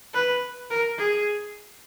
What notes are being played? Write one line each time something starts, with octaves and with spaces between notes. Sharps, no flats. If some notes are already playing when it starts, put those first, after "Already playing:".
B4
A#4
G#4